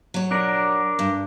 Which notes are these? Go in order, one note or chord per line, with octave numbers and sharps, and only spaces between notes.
F#3 C#5
D4 A#4
G2